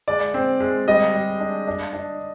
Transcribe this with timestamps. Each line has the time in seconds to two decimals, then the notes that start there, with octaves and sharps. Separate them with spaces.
0.08 G#3 D5
0.34 C4
0.60 G#3
0.87 G3 D#5
1.14 G3
1.40 D4
1.67 D4
1.93 D4